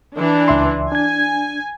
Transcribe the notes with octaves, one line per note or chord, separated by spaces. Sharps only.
E3 D4
C#2 E5 C6
D4 G#5 G#6